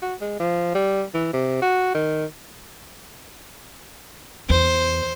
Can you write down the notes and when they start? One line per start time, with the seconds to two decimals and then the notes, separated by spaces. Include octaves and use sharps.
0.03 F#4
0.21 G#3
0.40 F3
0.75 G3
1.14 E3
1.34 C3
1.62 F#4
1.95 D#3
4.50 E2 C5